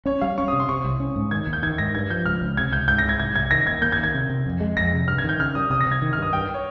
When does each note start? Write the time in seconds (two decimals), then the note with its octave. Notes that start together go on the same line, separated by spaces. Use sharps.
0.06 C#4 C#5
0.21 G3 F5
0.38 C#4 C#6
0.48 D#6
0.53 C3
0.60 C6
0.69 C3 C#6
0.84 C2
1.00 C#4
1.16 G#2
1.31 D#3 G#6
1.47 D#2
1.53 G6
1.63 D#3 G#6
1.78 G#2 A#6
1.95 G2 G#6
2.10 F3 G6
2.25 C#2 F6
2.42 C#2
2.57 C3 G#6
2.72 C#2 G6
2.88 G#2 G6
2.98 A#6
3.05 G#2 G#6
3.20 C2 G#6
3.35 C2 G#6
3.51 D#3 A#6
3.67 D#2 G#6
3.82 A#3 G6
3.92 G#6
3.98 D#3
4.04 G#6
4.14 C3
4.30 C3
4.46 F2
4.60 G#3
4.77 F2 A#6
4.93 C3
5.08 G2 F6
5.18 G#6
5.24 D#3 G6
5.39 C#3 F6
5.55 G3 D#6
5.70 C3 D#6
5.81 A#6
5.86 C3
5.92 G#6
6.02 D#3
6.13 F6
6.18 G2 D#6
6.33 G2 G5
6.54 C#5